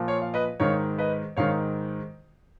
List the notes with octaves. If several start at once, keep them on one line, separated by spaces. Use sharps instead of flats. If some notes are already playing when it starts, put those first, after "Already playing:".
Already playing: A#2 F3
C#5 F5
F5
B4 D#5
G#2 D#3 C#5 F5
B4 D#5
G#2 D#3 C#5 F5